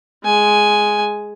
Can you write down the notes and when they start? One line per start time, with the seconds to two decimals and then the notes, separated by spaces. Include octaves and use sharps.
0.24 G#3 G#5